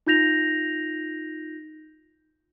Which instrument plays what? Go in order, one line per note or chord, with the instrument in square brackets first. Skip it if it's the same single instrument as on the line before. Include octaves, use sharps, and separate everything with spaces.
[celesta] D#4 F4 G6 A#6 F7